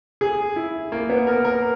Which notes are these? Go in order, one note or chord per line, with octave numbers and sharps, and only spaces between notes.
G#4
E4
A#3
B3
A#4
A#4